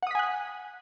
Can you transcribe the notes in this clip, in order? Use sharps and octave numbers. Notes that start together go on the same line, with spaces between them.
F#5 G#5 D#6 F#6 B6